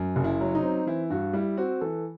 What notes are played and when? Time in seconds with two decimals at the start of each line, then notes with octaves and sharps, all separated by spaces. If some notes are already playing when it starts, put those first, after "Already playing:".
Already playing: F#2
0.16 F#1
0.24 E4
0.40 F#3
0.55 D#4
0.63 C4
0.87 E3 E4
1.10 G2 F#4
1.33 G3 E4
1.57 C4 F#4
1.81 E3 A4